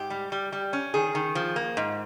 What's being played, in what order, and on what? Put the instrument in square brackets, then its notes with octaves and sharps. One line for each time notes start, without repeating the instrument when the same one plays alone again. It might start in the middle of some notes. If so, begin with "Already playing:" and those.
Already playing: [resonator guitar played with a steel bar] G#2 G4
G3
G3
G3
C#4
D#3 G#4
D#3
F3
A#3
G#2